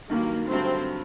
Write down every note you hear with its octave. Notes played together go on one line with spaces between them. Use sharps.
G2 D#3 F#3 A#3
G2 D3 F#3 A3 C4